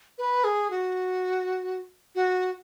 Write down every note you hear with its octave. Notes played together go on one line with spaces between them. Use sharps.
B4
G#4
F#4
F#4